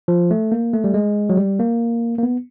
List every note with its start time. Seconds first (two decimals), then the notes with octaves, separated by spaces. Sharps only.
0.08 F3
0.31 A3
0.52 A#3
0.73 A3
0.84 G3
0.94 G#3
1.29 F#3
1.37 G3
1.59 A#3
2.18 A#3
2.23 B3